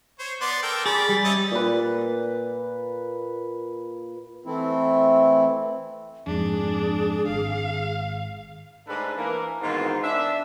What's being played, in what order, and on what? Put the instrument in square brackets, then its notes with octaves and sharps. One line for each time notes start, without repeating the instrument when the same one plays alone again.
[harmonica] C5 C#5
B3 D5 C6
A4 A#4 G5
[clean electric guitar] G#4 [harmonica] D5 B5 [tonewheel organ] A6
[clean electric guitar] G3
[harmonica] C#4 D#5 E5
[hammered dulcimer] A#2 B4
[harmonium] E3 A3 C4 E4
[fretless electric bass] F2 G#2 [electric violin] D4 [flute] G#4
[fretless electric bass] G#1 [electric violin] F5
[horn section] G#2 A3 D4 G#4 A4 B4
E3 A#3 A#4
G#2 B2 D#3 E3 C4 F4
D4 E5